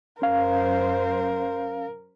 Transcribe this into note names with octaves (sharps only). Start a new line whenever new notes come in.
F#2 C#4 A#4 C5 F5